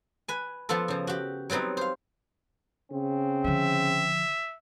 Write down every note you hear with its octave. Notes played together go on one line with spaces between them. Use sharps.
B4 G#5
F3 B3 F4 A4
C#3 F3
F#4 G4
F#3 G3 B3 C4 D#4
C5 F5
C#3 C4
D3 F3 E5